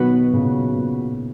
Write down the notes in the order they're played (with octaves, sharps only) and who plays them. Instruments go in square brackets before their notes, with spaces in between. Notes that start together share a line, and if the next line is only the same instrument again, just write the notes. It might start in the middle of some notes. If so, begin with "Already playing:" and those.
Already playing: [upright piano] B2 D#3 [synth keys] F#3 B3 F#4 B4
[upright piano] A#2 C#3
A#2